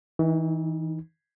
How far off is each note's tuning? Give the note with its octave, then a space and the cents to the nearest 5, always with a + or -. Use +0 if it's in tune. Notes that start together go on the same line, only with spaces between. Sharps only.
E3 -30 D#4 +0